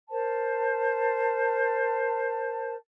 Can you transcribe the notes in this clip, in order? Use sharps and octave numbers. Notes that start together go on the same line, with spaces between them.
A#4 C5 A5